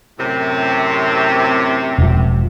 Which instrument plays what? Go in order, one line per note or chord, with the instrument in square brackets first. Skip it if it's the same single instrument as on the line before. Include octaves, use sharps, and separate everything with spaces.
[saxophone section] F#2 A2 C3
[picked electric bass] E1 F3